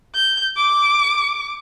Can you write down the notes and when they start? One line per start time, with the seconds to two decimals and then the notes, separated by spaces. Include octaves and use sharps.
0.15 G6
0.57 D6